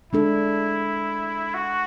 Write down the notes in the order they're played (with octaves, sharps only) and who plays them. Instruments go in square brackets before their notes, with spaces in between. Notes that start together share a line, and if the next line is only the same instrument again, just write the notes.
[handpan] G#3 D4 A4 [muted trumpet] E4
[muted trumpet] F#4